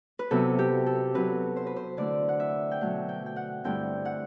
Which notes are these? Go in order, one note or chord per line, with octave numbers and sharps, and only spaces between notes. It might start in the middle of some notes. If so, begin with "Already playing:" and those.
B4
C3 F#3 B3 E4 A4
G4
A4
C3 F#3 C4 B4
C5
B4
C5
D3 A3 E4 D5
F#5
E5
G5
B2 F#3 A3 D4 F#5
G5
G5
F#5
G2 D3 A3 C4 E4 G5
F#5